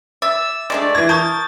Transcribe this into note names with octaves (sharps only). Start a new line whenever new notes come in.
E5 D6 E6 A6
G#3 A3 D4 D5
E3 G#6 A#6
A#4 A5 C#6 D#6 G6 A6